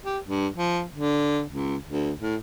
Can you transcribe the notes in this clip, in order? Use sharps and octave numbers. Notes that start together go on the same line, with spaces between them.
G4
G2
F3
D3
C#2
D2
A2